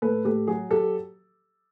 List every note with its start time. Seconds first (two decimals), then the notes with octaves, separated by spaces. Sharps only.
0.02 A2 A4 B4
0.25 A2 G4 A4
0.47 F#3 F#4 G#4
0.70 F#3 G4 A4